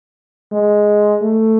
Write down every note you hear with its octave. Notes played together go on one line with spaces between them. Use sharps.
G#3
A3